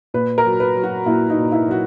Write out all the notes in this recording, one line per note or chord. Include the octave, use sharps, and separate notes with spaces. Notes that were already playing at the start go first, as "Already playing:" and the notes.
A#2 B4
A#4
F#3
B4
F#3
F#4
A#2 E4
D#4
A#2
E4
F#3 F#4